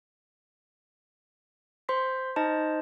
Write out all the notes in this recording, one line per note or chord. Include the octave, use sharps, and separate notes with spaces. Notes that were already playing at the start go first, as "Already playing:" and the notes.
C5 C6 B6
D#4 C5 D#5 A5